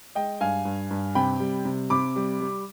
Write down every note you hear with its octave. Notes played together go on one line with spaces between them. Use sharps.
G#3 D#5 G5
G2 F5 G#5
G2
G2
C3 G5 B5
G3
C3
C3 B5 D6
G3
G3